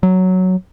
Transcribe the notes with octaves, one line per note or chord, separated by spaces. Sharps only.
F#3